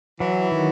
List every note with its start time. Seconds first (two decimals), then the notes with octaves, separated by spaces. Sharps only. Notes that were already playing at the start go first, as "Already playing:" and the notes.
0.20 E3 F#3
0.51 D#3